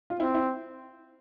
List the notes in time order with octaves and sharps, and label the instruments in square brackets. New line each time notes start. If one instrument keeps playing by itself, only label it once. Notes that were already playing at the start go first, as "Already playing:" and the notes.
[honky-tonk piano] F4
[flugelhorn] C4 [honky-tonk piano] E4
[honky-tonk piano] E4